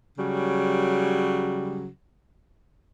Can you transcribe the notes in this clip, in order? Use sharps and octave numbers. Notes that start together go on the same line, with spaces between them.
C#3 F#3 G3